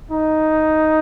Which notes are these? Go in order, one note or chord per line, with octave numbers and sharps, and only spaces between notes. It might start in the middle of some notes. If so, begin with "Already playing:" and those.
D#4